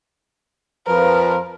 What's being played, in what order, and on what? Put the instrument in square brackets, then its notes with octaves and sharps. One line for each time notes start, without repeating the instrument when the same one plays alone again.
[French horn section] F2 F3 B4 [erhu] A#4